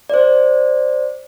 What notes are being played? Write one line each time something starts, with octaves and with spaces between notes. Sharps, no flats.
C5 D5